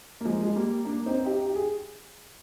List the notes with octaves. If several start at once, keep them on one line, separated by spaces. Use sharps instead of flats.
A#3
F3 G#3
G#3
G3 A#3
A#3 D4
C4 D#4
D#4 G4
G4
G#4